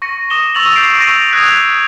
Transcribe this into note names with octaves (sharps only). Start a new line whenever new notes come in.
C#6 A#6 C#7 D#7
D6 D#6 A#6 D#7 E7 G7
C#6 E6 A6 F7 F#7
D6 E6 G6 B6 C7 D7
C#6 E6 A6 A#6 D7 D#7
D#6 F#6 G#6 A#6 B6 F7